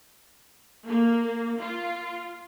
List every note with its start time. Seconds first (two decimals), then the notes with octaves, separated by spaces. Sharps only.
0.87 A#3
1.60 F4